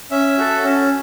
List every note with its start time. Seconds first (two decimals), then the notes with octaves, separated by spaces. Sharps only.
0.11 C#4 E5
0.38 F#4 A4
0.63 C#4